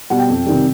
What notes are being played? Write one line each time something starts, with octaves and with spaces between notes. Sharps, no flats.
B2 G3 F#5
G5
F2
C3 D#3 G3